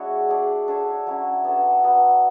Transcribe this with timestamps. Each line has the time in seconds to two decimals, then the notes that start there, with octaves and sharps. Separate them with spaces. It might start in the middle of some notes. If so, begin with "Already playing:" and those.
Already playing: G#3 D4 E4 F#4 G#4 C#5
0.29 D4 G#4 D5
0.68 D4 A4 C#5
1.07 F#3 C#4 E4
1.44 B3 D4 A4
1.83 F#3 B3 D4